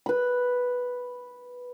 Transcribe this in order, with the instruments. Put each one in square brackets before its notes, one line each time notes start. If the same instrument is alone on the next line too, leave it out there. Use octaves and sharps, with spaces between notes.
[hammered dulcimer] B4 B5